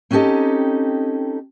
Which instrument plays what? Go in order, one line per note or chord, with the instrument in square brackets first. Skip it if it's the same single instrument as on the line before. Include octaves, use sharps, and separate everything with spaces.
[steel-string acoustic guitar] C4 C#4 D#4 G4 A4 D#5